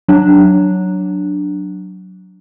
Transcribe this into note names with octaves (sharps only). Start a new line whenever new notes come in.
F#3 D4